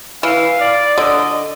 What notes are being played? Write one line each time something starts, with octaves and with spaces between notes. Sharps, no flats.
E3 F5
D5
D3 D#5